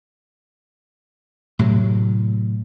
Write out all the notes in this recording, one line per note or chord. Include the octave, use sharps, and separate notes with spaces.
A2 C3 F#3